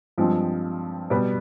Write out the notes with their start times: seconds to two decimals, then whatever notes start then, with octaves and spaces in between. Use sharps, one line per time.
0.18 G2 F3 G#3 C4
1.10 B2 G3 B3